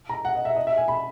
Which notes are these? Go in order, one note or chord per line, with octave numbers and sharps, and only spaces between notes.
A#5
F#5
D#5
E5
D#5
E5
G#5
B5